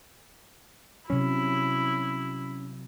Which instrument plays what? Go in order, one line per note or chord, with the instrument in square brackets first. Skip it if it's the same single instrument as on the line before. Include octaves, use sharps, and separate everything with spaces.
[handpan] C3 F#3 [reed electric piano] C#4 [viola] E4